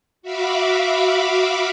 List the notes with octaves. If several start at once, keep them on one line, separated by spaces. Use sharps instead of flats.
F#4 E5 F5 B5 D6